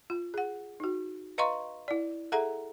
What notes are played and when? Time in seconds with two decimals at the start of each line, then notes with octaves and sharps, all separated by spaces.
0.10 F4
0.34 G#4 F#5
0.80 D#4 F#4
1.38 B4 D#5 F5 A#5 C6 C#6
1.88 E4 D5
2.32 G#4 A4 E5 F#5 A#5